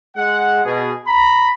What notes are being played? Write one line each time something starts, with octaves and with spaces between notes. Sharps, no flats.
G#3 F#5
B2 G#4
A#5 B5